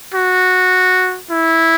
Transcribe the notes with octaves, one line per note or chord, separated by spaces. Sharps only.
F#4
E4